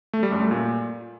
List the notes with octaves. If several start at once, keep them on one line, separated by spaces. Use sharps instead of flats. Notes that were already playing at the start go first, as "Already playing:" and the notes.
A3
G3
F#2
A3
A#2